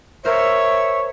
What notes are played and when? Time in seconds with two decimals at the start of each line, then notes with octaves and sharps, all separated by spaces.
0.25 A#4 C5 C#5 E5